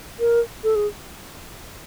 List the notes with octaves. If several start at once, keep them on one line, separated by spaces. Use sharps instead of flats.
A#4
A4
G#4